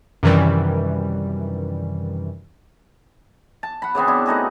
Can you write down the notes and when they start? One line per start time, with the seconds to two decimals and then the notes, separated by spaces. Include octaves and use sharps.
0.23 F#2 C3 D#3 E3 G3
3.63 A5
3.82 F#5 B5
3.95 C#3 E3 B3 C4
4.07 D4 E4
4.26 A3 D#4 F#4 G#4